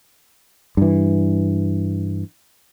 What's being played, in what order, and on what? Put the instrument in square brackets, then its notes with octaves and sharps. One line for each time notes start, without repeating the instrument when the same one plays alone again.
[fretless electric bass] G2 E3